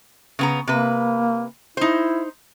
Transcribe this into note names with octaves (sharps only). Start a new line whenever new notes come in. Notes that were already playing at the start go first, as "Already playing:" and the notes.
C#3 B3 A#5
C3 A#3 B4
D#4 E4 C5